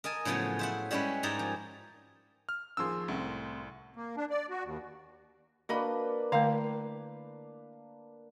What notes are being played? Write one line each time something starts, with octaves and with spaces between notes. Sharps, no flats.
A#4 D#5 G#5 A5
A2 C#3 F3 F#3 B3 G#5
C5 E5 F#5
G3 G#3 C#4 E4 B4
G#2 G4 G#4 A#4 A5 A#5
F3
F6
D#2 F3 G#4 C6 E6
C2 A2 C4
A#3
D4
D5
F#4
D#2
A#3 D4 F#4 B4 D#5 B5
D3 A3 E4 F5 A#5